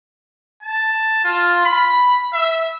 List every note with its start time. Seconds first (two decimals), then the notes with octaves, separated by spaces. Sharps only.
0.63 A5
1.24 F4
1.65 B5
2.33 E5